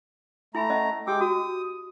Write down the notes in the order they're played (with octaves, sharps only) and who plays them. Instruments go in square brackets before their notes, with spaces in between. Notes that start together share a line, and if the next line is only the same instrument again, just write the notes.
[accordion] A3 A#5 [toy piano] E4 G#5 B5
[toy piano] C#4 D#5
[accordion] G#3 G5 D6 [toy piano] G4 E6
[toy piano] F#4 [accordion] D#6